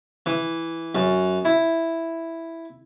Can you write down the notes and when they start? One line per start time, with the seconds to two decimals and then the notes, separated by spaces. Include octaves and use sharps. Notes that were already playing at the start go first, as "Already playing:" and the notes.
0.26 E3
0.95 F#2
1.45 E4